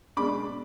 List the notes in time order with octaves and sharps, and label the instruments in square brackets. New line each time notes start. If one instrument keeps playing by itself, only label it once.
[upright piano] B2 G#3 D4 B5 D6